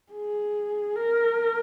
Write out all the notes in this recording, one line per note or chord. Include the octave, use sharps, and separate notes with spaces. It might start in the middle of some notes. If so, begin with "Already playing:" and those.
G#4
A#4